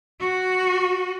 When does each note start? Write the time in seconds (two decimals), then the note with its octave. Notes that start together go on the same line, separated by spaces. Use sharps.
0.20 F#4